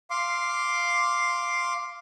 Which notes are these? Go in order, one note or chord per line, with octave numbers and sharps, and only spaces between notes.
F5 C6 D6